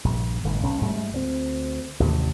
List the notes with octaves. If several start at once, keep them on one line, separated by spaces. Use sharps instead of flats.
A#1 G2
G1 A2
B1 C#4
G#2 G3 A3
D2 F#3 C4
A1 D#2 C3